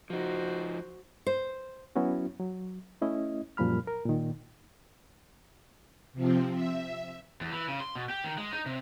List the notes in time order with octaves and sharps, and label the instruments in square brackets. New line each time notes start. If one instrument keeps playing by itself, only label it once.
[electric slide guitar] F3 D#4 [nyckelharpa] F#4 C5
[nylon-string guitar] C5
[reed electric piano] F#3 B3 C#4 E4 F#4
F#3
A3 C#4 E4 D#5
F#2 A#2 F3 G3 B5 F6
A#4
A#2 D#3
[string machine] C3 F3 C4
E5
[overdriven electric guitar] E2
E3
C#3
C6
B2
G4
D#3
G#3
D#4
C3